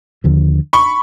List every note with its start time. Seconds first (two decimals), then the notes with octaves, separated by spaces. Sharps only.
0.24 D#2 D3 F3
0.73 B5 C#6